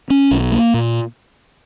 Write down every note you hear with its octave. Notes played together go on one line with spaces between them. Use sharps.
C#4
B1
A#3
A#2